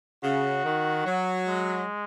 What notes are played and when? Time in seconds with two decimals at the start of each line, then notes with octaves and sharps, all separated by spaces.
0.23 C#3 F#4
0.64 D#3
1.05 F#3
1.47 G#3